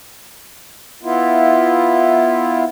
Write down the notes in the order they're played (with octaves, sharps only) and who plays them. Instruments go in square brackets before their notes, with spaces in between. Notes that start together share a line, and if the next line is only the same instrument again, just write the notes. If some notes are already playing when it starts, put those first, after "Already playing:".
[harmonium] B3 E4 F4